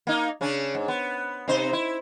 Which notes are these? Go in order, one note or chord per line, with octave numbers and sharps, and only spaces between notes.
A#3 D#4
C#3 C#4 D4
G#2
B3
C3 D#4 C5
E4